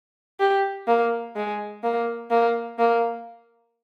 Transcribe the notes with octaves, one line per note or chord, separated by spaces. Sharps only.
G4
A#3
G#3
A#3
A#3
A#3